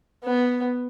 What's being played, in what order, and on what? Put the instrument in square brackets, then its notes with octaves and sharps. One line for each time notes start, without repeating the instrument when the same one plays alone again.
[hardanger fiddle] B3